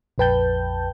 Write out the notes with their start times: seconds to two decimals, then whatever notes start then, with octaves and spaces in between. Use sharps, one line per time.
0.18 A#1 F2 B4 G5 A5 G6